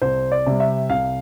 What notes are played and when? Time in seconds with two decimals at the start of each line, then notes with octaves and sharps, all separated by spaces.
0.02 C2 C5
0.32 D5
0.46 C3 G3
0.60 E5
0.90 C2 F5